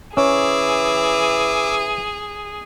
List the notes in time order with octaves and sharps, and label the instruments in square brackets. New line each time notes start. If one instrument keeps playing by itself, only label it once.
[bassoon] E3 [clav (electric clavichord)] C#4 [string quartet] G#4 [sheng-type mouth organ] D6 E6